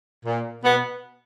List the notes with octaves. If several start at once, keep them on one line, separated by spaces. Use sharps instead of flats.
A#2
B2 B3